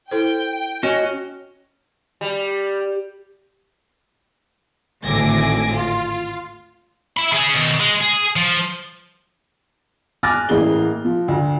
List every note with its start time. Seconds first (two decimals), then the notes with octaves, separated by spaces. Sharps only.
0.11 E4 A4 C5 G5
0.83 C#4 F#4 D#5
2.21 G3
5.04 G#1 D2 A2 G#5 D6 A#6
5.73 F4
7.17 E5 B5
7.32 C#4 G#4
7.54 B2 D#3
7.80 G#3
8.01 G#4
8.36 F3
10.23 G#5 D6 F6 F#6 A6 A#6
10.49 A1 E3 A#3 G#4 G7
11.05 F3
11.28 D2